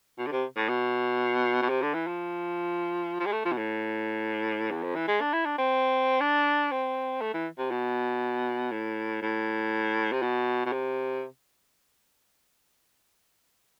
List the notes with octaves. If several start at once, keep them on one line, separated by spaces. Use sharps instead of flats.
B2
D3
C3
A2
B2
B2
C3
D3
E3
F3
F3
G#3
A3
F3
B2
A2
E2
F2
E3
G#3
D4
E4
D4
C4
D4
C4
A3
E3
C3
B2
A2
A2
C3
B2
B2
C3